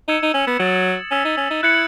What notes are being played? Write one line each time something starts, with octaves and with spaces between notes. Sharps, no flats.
D#4 E6 G#6 C#7 E7
D#4
C#4
B3
F#3 D#6 A6 C#7 F#7
C#4 E6 G#6 B6 E7
D#4
C#4
D#4
E4 F#6 C#7 F#7